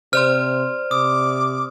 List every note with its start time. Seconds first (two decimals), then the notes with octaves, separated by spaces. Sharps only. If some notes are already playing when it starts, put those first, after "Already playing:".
0.13 C3 C5 D5 C6 F6
0.91 C3 D6 D#6